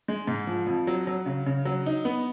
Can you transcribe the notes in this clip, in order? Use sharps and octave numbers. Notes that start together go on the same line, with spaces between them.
G#3
G#2
F3
F2
F#3
F#3
C#3
C#3
F#3
D#4
B3